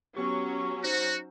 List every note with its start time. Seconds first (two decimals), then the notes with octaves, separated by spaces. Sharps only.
0.16 F#3 B3 C#4 G4 C#6
0.84 D#4 F#4 C5